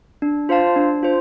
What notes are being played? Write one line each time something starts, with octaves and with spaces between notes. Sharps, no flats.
D4
F4 C5 F5 A5
D4
F4 C5